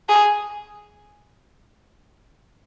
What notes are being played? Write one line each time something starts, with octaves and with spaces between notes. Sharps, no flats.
G#4